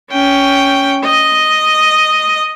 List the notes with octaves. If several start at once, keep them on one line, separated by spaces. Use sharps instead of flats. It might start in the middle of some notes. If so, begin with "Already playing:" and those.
C#4 G5
D#5